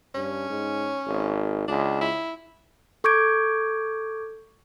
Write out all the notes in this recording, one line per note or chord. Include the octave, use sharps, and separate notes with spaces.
G2 C#4
G#2
G#1
C#2 D4
E4
A4 C#6 D6 G6 G#6 D7